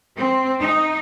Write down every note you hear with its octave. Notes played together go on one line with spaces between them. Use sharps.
C4
D#4